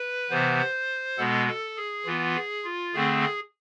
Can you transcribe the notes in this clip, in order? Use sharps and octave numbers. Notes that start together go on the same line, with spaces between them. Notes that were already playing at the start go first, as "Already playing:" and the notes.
Already playing: B4
C3 E3 B3 C5
B2 G#3 B3 A4
A4
G#4
E3 B3 F4
G#4
F4
D3 A3 C4 G#4